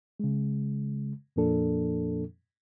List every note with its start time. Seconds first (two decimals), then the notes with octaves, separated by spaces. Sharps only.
0.20 C#3 G#3
1.36 F2 A#2 F3 A#3 D4 A4